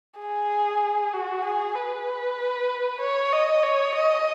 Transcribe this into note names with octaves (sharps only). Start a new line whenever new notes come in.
G#4
F#4
G#4
B4
C#5
D#5
C#5
D#5